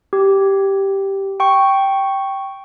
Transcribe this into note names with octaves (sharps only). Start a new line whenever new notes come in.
G4
G5 C#6